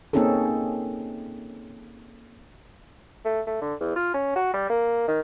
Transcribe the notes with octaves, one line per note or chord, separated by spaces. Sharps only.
A#3 C4 C#4 D#4 G#4 A4
A3
A3
D3
E2
F4
C#4
F#4
G3
A#3
D#3